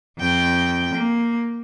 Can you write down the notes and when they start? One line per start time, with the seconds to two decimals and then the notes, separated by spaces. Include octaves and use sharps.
0.19 F2 G5
0.95 A#3